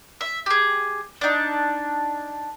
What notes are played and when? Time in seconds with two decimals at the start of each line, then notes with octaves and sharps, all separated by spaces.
0.21 E5
0.46 G4 G#4
1.21 D4 D#4